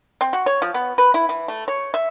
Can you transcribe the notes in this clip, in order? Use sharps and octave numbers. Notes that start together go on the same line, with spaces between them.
C4
F#4
C#5
F3
B3
B4
E4
E3
A3
C#5
E5